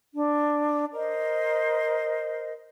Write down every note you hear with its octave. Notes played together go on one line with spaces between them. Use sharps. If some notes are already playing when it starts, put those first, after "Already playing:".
D4
A#4 C5 D#5